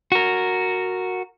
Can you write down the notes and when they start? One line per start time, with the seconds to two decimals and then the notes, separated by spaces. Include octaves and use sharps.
0.12 F#4 A#4